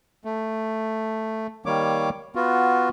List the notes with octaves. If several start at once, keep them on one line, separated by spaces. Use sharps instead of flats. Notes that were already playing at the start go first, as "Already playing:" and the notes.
A3
D#3 G3 A#3 C#5 D6
B3 F4 F#4